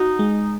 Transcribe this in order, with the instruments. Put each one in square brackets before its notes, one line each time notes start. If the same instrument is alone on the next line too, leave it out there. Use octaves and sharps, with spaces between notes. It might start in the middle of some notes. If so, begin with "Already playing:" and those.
Already playing: [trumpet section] D#4 [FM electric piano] F#4
[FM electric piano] G#3